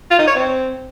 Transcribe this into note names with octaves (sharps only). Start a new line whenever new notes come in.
F4
D#4
C#5
C4